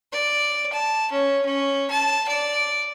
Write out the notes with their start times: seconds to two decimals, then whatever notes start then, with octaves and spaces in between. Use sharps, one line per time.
0.13 D5
0.73 A5
1.12 C#4
1.46 C#4
1.90 A5
2.28 D5